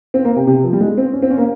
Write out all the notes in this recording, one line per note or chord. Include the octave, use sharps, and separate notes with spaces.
C4
A#3
C3
C3
F3
G3
G#3
C4
C#4
C4
C#4
A#3